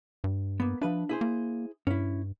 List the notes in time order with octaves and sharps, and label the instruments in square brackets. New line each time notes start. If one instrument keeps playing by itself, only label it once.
[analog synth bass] G2
[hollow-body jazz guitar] A#3 B3
[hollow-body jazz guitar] F3 B4 E5 [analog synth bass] D4
[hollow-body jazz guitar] E4 G#4 C5
[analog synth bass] A#3
[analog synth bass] G2 [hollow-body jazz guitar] C#4 E4